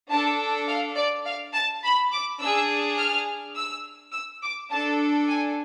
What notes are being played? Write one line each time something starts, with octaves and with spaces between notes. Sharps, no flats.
D4 A4 A5
F5
D5
F5
A5
B5
D6
D4 G#4 E6
F6
E6
E6
D6
D4 A4 A5
G#5